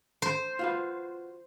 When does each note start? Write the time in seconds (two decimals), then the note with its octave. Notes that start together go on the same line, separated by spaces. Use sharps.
0.22 C5
0.59 F4 F#4 B4